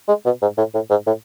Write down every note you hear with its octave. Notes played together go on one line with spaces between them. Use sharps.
G#3
B2
G#2
A2
A2
G#2
A2